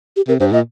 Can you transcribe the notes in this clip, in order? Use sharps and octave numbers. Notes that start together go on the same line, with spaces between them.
G4
C3 A#4
G2 C5
A#2 D#5